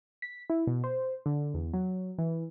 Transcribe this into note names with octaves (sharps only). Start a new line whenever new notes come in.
B6
E4
B2
C5
D3
E2
F#3
E3